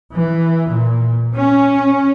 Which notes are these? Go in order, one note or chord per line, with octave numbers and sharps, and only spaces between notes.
E3
A#2
C#4